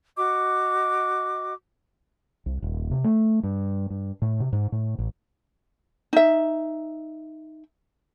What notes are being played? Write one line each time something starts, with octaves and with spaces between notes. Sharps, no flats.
F#4 D#5 D6
C2
D#1
C3
A3
G2
G2
A2
C3
G#2
A2
A1
D#4 E5